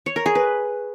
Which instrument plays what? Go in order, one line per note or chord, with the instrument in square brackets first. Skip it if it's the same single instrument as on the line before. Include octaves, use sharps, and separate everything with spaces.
[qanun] C#5
A#4
G#4
B4